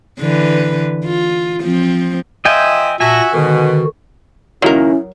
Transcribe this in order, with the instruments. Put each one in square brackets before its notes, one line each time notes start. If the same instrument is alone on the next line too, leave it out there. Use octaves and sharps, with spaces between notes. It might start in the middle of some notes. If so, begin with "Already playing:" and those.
[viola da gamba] D3 E3 B4
F4
F3 C4
[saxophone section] F3 F4 E5 [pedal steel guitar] D#5 G5 G#5
[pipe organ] A#2 A5 A#6 [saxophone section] F#4 E5 [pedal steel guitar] G#5
[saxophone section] G#2 B2 [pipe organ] D3 D#3 F#4
[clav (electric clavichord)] C#2 D#3 A#3 [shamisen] F#3 A#4 [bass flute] C#4 [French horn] E4